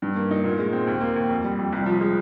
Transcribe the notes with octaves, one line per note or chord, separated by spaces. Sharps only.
G2
A#3
D#4
A#2
G#3
C4
D#2
A#3
D#2
F2
G3
F2
C2
F3
G#3